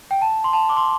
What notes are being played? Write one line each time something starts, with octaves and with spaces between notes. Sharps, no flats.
G5
A5
C6
A5
D6
C6